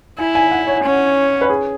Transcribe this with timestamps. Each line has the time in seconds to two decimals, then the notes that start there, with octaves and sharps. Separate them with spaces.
0.18 E4 G#5
0.35 G#5
0.52 F#5
0.67 C#5
0.83 C#4
1.41 B4
1.49 G#4